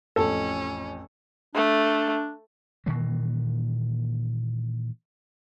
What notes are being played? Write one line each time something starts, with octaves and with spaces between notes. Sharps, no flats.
A1 F2 C#4 A4
A3 D4
A#2 D#3 E3 A#3